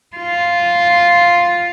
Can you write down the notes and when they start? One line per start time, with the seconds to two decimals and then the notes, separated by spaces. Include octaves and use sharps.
0.16 F4